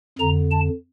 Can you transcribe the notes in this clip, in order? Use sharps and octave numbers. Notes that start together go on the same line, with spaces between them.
F2 D3 A#5
A5